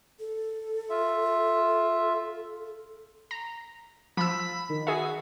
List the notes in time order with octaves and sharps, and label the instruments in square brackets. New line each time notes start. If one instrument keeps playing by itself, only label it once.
[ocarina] A4
[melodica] F4 E5
[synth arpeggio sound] A#5
[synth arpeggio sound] F3 E6 [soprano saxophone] B5
[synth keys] D#3
[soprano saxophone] F#4 [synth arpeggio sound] G#4 E5